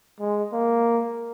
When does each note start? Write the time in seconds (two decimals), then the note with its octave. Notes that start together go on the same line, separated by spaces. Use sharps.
0.20 G#3
0.53 A#3